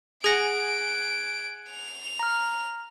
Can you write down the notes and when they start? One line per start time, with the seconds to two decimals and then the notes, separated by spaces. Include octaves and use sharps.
0.24 G#4 F#5 G#5 A#6 D7
1.70 F7
2.19 A#5 F6